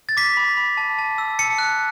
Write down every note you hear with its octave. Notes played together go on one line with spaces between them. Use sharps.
A6
D6 B6
B5
B5
A5
A5
E6
A5 C#7
F#6